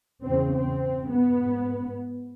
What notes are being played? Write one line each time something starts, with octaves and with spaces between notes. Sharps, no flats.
E2 C#3 C4
C4
B3
G#2